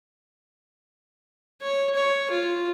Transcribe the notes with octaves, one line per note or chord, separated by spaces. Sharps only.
C#5
C#5
F4